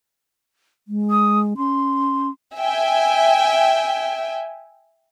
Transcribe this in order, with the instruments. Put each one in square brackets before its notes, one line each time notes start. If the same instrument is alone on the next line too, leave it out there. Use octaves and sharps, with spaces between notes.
[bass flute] G#3
[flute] D#6
[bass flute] C#4 [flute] C6
[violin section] E5 G5 G#5